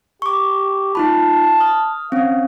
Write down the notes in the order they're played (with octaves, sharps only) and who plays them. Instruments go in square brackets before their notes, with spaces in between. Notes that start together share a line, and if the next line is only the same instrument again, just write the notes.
[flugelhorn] G4 [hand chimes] C#6 D6
[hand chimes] D#4 F4 B5 [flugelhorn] A5
[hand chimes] D#6 F6
[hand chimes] C4 C#4 [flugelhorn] F5